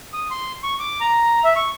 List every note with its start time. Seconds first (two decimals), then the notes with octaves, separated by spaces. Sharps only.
0.13 D#6
0.31 C6
0.63 C#6
0.79 D6
1.01 A#5
1.44 E5
1.56 C#6